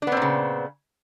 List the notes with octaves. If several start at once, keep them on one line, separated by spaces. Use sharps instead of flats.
A#2 C#3 B3 C4 D4